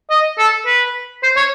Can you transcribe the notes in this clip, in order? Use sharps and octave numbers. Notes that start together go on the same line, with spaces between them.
D#5
A4
B4
C5
C#5